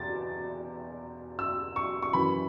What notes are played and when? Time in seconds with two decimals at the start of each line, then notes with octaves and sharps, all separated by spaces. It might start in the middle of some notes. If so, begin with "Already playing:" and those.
Already playing: E2 B2 A6
1.39 E6
1.76 C#6
2.02 C#6
2.13 F#2 E3 B5